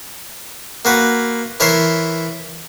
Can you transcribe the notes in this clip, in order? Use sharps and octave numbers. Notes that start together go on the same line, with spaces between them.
A#3 F#4 B4
E3 A#4 C#5 E5 C6